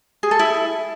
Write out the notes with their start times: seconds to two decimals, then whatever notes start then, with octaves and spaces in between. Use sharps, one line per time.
0.23 G#4
0.31 A4
0.39 E4